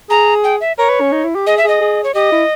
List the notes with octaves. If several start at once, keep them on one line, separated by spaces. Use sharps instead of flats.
G#4 A#5
G5
E5
A#4 C#5
B4
C#4
D#4
E4
G4
G#4 D#5
E5
G#4 D#5
G#4
C#5
G4 D#5
E4